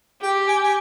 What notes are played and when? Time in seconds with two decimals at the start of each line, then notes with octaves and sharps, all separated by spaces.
0.22 G4 G5
0.48 G#5
0.63 G#5